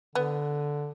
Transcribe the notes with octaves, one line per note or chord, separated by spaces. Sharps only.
D3 B3